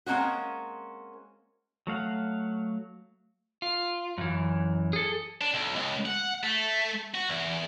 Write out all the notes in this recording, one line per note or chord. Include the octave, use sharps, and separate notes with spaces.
G#3 A#3 C4 C#4 F#4
F#3 A3 F5 F#5
F4
F#2 E3
G#4 A4
D4
B1
C#2
F#5
A3
F#4
E2